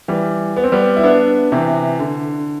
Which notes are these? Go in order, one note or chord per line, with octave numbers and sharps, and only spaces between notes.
E3 G3
B3
C4
G3 B3
E4
B3 D4
C3 E3
D3